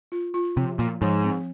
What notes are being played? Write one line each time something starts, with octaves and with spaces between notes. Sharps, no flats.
F4
F4
C3 F3
A#2 F3
G#2 F3
C4